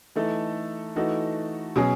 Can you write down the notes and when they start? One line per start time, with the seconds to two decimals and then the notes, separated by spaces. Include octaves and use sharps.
0.16 E3 A3 D#4 A4
0.96 E3 A3 D#4 F#4 A4
1.76 B2 F#3 C#4 G#4